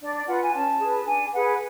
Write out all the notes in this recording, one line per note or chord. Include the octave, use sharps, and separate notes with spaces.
D4 D5
D5
F4 B4 F#5
G#5
C#4 A5
G#4 B4
D4 G#5
G#4 B4 F#5